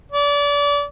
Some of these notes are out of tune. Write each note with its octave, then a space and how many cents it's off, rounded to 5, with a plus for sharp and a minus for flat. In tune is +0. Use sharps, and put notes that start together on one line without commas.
D5 -30